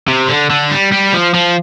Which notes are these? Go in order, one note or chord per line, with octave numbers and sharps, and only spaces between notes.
C3
D3
D3
G3
G3
F3
F3